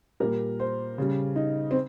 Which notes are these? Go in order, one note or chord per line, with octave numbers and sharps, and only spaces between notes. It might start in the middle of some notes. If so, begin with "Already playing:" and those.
A#2 G3 A#4
C5
C#3 G3
D#4
C4